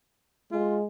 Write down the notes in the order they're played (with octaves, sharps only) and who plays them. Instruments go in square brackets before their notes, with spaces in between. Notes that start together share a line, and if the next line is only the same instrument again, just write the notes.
[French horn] G#3 [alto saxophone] F4